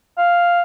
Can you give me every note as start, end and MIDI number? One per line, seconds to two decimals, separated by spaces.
0.18 0.62 77